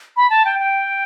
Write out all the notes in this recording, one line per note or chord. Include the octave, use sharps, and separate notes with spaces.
B5
A5
G5
G5